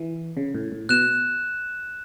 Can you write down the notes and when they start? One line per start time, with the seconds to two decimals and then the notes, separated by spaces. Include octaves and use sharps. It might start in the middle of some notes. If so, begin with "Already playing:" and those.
Already playing: E3
0.37 C#3
0.54 A2
0.72 A2
0.89 B2 F#6 E7